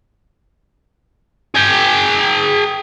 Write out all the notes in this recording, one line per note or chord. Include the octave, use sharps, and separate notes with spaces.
G#4 G5